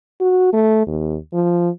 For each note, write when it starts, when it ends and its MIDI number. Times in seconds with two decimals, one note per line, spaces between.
0.21 0.49 66
0.53 0.84 57
0.87 1.17 39
1.33 1.69 53